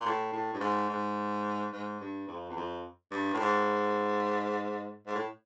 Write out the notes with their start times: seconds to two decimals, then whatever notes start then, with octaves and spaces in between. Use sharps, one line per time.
0.01 A#2
0.05 A2
0.32 A2
0.53 G2
0.60 G#2
0.89 G#2
1.72 G#2
2.00 G2
2.27 F2
2.49 E2
2.56 F2
3.11 G2
3.33 A2
3.40 G#2
5.07 G#2
5.15 A2